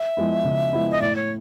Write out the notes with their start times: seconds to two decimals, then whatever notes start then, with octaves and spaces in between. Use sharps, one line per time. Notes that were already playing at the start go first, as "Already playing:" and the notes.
Already playing: E5
0.17 F3 G#3 B3 E4
0.44 C#3
0.73 F3 G#3 B3 E4
0.91 D#5
1.02 A2 D5
1.15 C#5